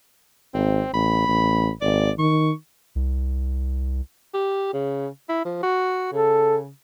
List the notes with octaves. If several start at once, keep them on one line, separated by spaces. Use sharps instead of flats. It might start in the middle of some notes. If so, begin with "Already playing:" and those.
G#1 C4
A1 B5
A1
G#1 D5
D#3 C#6
C2
G4
C#3
E4
F3
F#4
C#3 A4